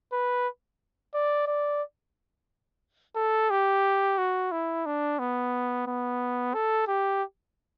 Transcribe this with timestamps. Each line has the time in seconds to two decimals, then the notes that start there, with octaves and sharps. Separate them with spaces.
0.12 B4
1.14 D5
1.47 D5
3.16 A4
3.50 G4
4.18 F#4
4.51 E4
4.86 D4
5.19 B3
5.87 B3
6.54 A4
6.88 G4